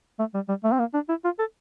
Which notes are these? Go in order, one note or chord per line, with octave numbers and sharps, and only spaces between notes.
A3
G3
G3
A3
C4
A#3
D4
E4
F4
A4